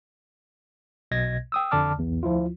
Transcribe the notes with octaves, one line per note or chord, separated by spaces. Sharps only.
B1 B2 D#5 G#6 A#6
G5 D#6 E6
F2 D3 D5 A5 D6 F6
B1 E2
D2 F3 E4 F4